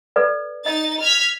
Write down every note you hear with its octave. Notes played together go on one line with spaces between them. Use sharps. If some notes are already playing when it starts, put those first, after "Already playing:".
A4 B4 D5
D#4 D#5 A6
F6 G#6 B6